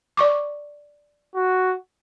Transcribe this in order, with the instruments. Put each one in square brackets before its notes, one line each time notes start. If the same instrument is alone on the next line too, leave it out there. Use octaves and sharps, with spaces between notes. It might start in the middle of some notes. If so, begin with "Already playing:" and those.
[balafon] D5 C#6 D6
[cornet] F#4